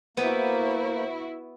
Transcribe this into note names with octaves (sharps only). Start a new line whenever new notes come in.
A#3 B3 E4 F#4 C5